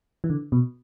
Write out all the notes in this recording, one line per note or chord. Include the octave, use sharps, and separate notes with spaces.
E3
D3
B2